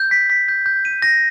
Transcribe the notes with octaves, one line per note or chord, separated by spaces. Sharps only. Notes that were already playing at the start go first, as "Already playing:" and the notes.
Already playing: G6
B6
B6
G6
G6
D#7
A#6